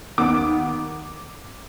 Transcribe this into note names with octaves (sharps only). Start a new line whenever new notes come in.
D#2 D#3 B3 D6